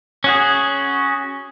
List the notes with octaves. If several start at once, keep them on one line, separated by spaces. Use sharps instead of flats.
C#4 F#4 G#4